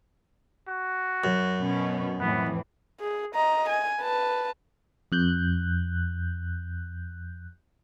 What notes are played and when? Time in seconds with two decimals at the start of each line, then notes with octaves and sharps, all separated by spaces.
0.68 F#4
1.24 F#2
1.61 B2 B3 C#4
2.21 F2 A2 E3 B3
3.00 G#4
3.35 D#5 A#5
3.69 G#5
4.01 B4 A5
5.12 F2 F#6 G6